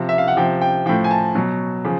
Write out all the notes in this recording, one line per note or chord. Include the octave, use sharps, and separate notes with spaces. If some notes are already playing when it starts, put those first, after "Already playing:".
Already playing: C3 F3
E5
F5
F#5
C3 F3 G5
G5
A2 F3 G5
G#5
A5
B2 F#3
C#3 F3